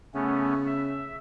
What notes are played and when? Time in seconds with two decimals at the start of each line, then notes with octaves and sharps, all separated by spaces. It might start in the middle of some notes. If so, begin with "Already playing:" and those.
0.14 C#3 A3 B3 C#4
0.67 E5